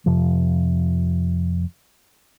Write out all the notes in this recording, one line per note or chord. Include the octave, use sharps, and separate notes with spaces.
F2 C3 F3